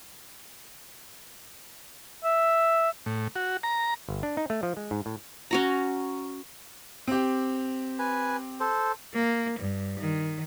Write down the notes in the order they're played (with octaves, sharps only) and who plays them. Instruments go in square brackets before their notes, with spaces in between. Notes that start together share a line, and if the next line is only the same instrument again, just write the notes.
[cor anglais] E5
[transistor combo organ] A2
F#4
A#5
[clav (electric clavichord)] G1
D4
D#4
A3
F3
G#3
G#2
A2
[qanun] C#4 F#4 A#5
[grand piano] C4 G4
[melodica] B4 G#5
A4 C5
[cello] A#3
G2
D#3